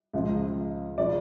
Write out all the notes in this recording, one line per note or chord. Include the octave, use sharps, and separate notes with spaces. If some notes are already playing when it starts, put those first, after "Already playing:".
C#2 C#3 F3
C#3 F3 D5